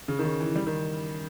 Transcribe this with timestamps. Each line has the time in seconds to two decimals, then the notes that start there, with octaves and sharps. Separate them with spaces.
0.08 C#3
0.19 D#3
0.24 C#3
0.40 E3
0.56 G3
0.67 D#3